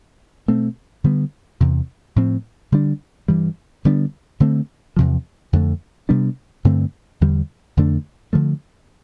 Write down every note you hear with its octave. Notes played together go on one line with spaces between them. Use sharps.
B2 A3 C4
D3 G3 B3
E2 C3 E3
A2 F3 C4
D3 G3 D4
G2 E3 G3
D3 G3 B3 D4
D3 A3 C4
E2 C3 F3
F2 D3 A3
C3 G3 B3 D4
G2 D3 A3 C4
E2 D3 G3
F2 D3 A3 D4
D3 F3 A3